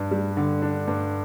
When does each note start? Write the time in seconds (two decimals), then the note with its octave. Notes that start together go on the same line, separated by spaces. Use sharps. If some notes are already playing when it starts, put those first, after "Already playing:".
Already playing: G2 D4
0.11 G3
0.37 D3
0.62 D4
0.88 G2